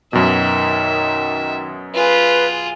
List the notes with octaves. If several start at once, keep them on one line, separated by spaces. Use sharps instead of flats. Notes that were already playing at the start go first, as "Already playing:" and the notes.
F#2 B2 D#3 E5
F4 G#4 B4